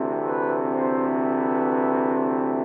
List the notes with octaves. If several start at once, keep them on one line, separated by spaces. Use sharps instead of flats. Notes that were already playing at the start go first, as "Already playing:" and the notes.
Already playing: D2 C3 E3 A3 C4
B4
C5
B4